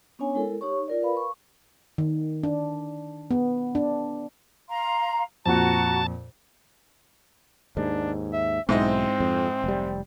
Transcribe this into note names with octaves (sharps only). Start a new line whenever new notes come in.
B3 C#4 D4 C#5 G#5
G#3 E4 A4 A#4
D#4 G4 C#5 C#6
F4 A#4 D5
A#4 B4 F5 B5
C#6
D#3
D4
B3
D4
F5 A#5 C6
F2 A#2 F#4 A5 A#5
D#2 G#2 D4
E5
B1 G#2 C4 E4 D#5
F2
F1 G3